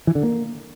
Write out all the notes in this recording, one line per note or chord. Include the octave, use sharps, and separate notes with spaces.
E3
D3
A#3